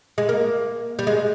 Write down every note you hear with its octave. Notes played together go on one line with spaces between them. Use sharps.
G#3
A#3
G3
G#3